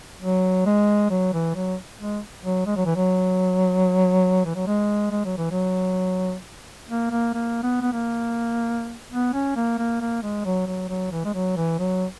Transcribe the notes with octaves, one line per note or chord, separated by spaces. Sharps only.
F#3
G#3
F#3
E3
F#3
G#3
F#3
G#3
F#3
E3
F#3
E3
F#3
G#3
G#3
F#3
E3
F#3
A#3
A#3
A#3
B3
B3
A#3
B3
C#4
A#3
A#3
A#3
G#3
F#3
F#3
F#3
E3
G#3
F#3
E3
F#3